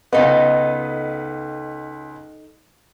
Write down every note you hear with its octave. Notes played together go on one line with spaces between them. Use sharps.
C#2 B3 D#4 A4 D#5